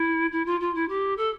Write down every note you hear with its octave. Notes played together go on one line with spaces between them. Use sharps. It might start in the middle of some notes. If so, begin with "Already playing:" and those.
Already playing: E4
E4
F4
F4
E4
G4
A4